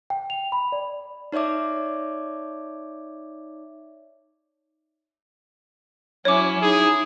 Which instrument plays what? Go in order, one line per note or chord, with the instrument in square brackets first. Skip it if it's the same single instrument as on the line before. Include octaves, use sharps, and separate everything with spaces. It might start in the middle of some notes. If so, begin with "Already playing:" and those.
[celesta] G5
F7
B5
D5
[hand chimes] D#4 C#5 D5 E5 D6
[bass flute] F#3 [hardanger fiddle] C#4 E4 [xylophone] C#5 D6
[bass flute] D#4 [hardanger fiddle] E4 [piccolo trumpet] G#4